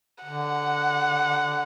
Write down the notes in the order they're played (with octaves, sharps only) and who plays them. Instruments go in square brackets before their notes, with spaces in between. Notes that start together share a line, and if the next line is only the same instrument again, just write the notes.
[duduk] D3 [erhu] F#5